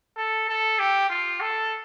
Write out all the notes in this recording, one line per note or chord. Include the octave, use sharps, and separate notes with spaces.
A4
A4
G4
F4
A4